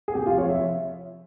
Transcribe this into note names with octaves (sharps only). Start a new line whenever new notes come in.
G#4
C3 G4
F4
F3
C#5
F3 E5